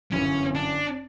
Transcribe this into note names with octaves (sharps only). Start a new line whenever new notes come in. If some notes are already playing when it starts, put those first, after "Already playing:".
G1 F#2 E3 C#4
D4